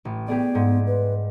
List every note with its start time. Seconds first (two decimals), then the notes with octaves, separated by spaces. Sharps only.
0.05 A1
0.28 B3 G4 G#4 D5
0.55 G#2
0.87 B4